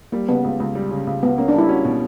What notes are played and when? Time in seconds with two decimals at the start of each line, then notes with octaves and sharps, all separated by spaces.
0.12 G3 A#3
0.28 C#3 B3
0.44 C#2
0.60 C#2
0.75 G3
0.91 C#3
1.07 C#2
1.23 C#2 B3
1.38 A#3 C#4
1.48 D4
1.54 G3 E4
1.69 C#4 F#4
1.85 B2